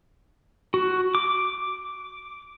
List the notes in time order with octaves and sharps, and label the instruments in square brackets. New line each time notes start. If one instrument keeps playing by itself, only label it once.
[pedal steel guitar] F#4
D6